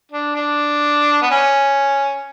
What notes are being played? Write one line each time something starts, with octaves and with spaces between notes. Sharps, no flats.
D4
D4
B3
C#4